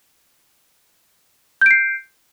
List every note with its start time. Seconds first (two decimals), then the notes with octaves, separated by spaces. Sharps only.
1.61 G6
1.66 D7
1.71 C7